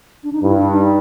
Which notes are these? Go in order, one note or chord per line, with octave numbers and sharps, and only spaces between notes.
D4
D#4
G2 E4
D4
D#4